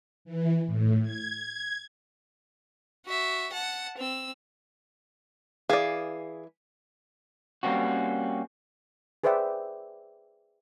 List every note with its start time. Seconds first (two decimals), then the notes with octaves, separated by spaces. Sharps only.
0.25 E3
0.67 A2
1.03 G#6
3.05 F#4 E5
3.52 F#5 A5
3.97 C4 E6
5.69 E3 G#4 D5 F5
7.63 G3 A#3 C4 C#4 F#4
9.24 G#4 B4 C5 D5 E5 G5